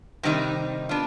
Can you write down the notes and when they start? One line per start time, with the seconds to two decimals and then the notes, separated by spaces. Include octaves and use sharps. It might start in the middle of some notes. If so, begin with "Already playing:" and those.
0.23 C3 D#3 G3 C4 D#4
0.89 B3 D4 F4